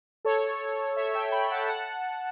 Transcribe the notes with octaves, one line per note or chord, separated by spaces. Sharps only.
A4 C#5
C#5 E5
E5 G5
G5 B5
F#5 A5
F#5 A5